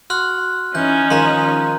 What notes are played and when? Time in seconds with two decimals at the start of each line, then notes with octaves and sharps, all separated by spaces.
0.10 F#4 C6 F6 F#6
0.75 E3 C#4 D#4 G6
1.10 D#3 F3 G#3 A#5 C6